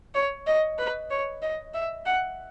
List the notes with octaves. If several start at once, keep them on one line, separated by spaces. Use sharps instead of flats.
C#5
D#5
B4
C#5
D#5
E5
F#5